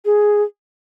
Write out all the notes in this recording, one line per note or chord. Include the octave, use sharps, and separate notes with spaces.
G#4